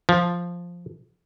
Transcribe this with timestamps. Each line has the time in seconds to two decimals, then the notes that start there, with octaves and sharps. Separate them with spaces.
0.09 F3